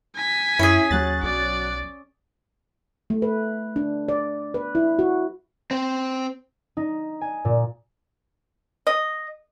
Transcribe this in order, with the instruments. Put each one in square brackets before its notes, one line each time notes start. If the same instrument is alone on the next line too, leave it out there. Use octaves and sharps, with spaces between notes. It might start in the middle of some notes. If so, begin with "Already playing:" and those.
[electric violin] G#5 B6
[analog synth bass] F#2 [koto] C#4 G#4 [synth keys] E4
[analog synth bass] D#2 [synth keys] F#3 F#6 A6
[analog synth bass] B1 [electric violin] D5
[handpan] A3
B4
D4
D5
B4
E4
F#4
[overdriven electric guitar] C4 C5
[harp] D#4
G#5
A#2
[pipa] D#5